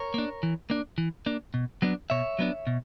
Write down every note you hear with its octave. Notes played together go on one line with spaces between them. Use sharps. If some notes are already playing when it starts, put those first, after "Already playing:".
Already playing: A#4 C#5
A#3 D4
E3
A#3 D4
E3
A#3 D4
B2
F#3 B3 D4
B2 C#5 E5
F#3 B3 D4
B2